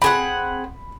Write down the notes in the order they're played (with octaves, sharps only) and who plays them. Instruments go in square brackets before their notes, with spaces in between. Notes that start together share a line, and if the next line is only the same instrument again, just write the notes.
[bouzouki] C4 G#4 F#5 [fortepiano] B5